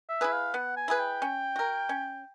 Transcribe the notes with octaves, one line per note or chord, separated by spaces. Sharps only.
E5
E4 G#4 B4
F5
B3 F#5
G#5
E4 G#4 B4
G5
C#4
F#4 A#4
C#4